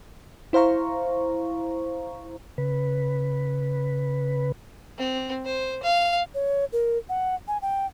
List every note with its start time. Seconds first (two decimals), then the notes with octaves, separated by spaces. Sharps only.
0.53 E4 C5 F5 A#5 C#6
2.58 C#3 B4
4.98 C4
5.45 C5
5.83 F5
6.35 C#5
6.73 A#4
7.09 F#5
7.48 G#5
7.62 G5